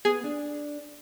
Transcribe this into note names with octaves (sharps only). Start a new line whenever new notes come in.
B3 G#4
D4